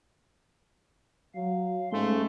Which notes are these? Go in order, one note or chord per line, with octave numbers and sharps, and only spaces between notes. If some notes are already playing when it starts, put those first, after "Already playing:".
F#3 F5
G#2 A3 C#4 C6